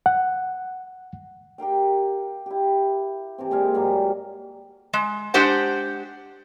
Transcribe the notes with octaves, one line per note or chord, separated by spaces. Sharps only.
F#5
G4 A#4 F5 G5
E4 G4
C3 E3 C4
A#2 G#3 F5 G#5
G#2 F#3 G3
G#3
G#3 D4 G4 C5 F#5